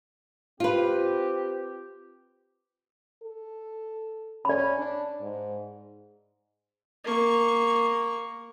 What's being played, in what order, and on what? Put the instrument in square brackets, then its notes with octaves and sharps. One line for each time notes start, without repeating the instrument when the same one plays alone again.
[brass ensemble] C4 G4 [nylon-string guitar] F4 B4
[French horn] A4
[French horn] C#4 [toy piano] D5 B5
[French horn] D4
G#2
[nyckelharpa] A#3 C#6